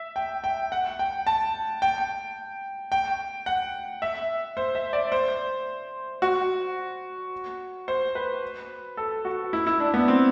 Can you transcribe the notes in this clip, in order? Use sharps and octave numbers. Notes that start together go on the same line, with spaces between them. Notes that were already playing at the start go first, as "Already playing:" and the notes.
Already playing: E5
G5
G5
F#5
G5
A5
G5
G5
F#5
E5
C5
E5
D5
C5
F#4
C5
B4
A4
F#4
E4
E4
D4
B3
C4